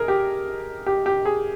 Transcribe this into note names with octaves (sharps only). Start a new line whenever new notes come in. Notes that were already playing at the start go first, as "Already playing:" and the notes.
Already playing: G#4 A#4
G4
G4
G4
G#4